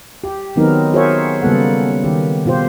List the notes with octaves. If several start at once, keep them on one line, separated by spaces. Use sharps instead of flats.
G4
D#3 F#3 B3 C4 D#4 A#4
F#4 G#4 A#4 C5 C#5 E5
C#3 G3 A#3 B3 A4 F#5
D#3 G4
B2 F4 G4 C5